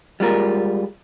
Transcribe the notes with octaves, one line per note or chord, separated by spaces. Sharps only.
G3 G#3 F4 A#4